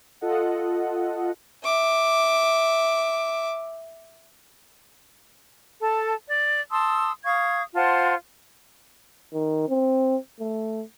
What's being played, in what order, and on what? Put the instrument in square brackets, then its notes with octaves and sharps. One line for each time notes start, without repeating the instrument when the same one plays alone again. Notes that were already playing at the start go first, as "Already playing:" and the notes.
[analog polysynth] F4 A4 D#5 F#5
[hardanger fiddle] E5 D6
[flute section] A4 A5
D5
A5 C6 D#6 E6
F5 C#6 D#6 G#6
F4 C5 F#5 A5
[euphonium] D#3
C4
A3